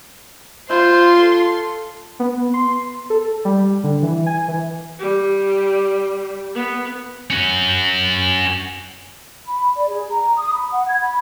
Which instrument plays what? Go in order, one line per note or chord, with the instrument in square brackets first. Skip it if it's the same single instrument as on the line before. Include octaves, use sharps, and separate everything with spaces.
[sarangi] F4 [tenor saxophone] C5 [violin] C6
[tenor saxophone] A4
[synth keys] B3
C6
A4
G3
D3
E3
G#5
E3
[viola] G3
B3
[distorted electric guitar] C#4 F#4
[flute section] B5
D5
G#4
A#5
D#6
B5
F#5
G#6
B5